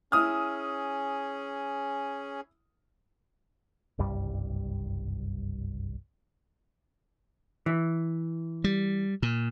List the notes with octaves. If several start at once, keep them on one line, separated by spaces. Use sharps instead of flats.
C#4 E4 G#4 D#6 F6
F#1 C2 G2 G3
E3
G3
A#2